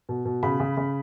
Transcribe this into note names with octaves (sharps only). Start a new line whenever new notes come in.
B2
B2
C#3 B5
C#3
C#3